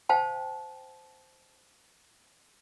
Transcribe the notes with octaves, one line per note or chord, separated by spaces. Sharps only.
C5 F5 G5 A5